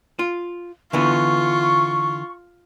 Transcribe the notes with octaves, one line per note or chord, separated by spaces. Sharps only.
F4
D3 E3 B3 F4 C#6